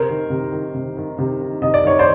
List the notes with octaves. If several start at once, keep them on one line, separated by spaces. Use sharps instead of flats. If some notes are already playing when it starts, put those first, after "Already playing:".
Already playing: C3 A#4 C5
D#3
C3
D#3
C3
D#3
C3
D#3
C3 D#5
D5
D#3 C#5
C5 D5